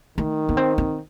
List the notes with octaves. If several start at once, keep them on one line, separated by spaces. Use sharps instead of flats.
D#3 A3
B3
C4
C4